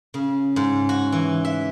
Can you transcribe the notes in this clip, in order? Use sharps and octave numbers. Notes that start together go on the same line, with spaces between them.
C#3
G#2
F#4
E3
E5